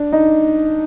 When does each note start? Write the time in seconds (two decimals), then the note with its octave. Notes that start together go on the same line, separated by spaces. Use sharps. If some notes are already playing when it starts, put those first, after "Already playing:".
Already playing: D4
0.12 D#4